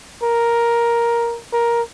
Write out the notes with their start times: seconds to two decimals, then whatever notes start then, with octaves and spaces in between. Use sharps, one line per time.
0.23 A#4
1.53 A#4